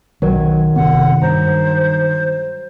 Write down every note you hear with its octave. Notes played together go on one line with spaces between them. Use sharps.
B1 D#3 F#3 G#6
F#1 C3 B3 F#5
G2 C5 A#5